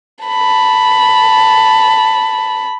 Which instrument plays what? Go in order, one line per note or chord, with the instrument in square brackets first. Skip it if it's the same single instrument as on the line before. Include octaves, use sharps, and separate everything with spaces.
[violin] A5 B5